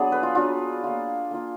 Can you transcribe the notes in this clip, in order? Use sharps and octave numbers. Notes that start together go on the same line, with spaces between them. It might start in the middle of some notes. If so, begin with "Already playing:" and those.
Already playing: F#3 B3 D4 G#4
B4
F4
F#3 B3 D4 F4
A#3 F4
A#3 F4